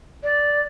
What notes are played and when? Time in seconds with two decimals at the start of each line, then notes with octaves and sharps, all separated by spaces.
0.23 D5